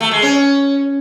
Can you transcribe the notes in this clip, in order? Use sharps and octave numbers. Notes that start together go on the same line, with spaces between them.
A3
G#3
C#4